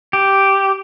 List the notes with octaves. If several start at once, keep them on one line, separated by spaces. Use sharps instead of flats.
G4